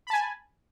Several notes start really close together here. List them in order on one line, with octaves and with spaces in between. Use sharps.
B5 A5 G#5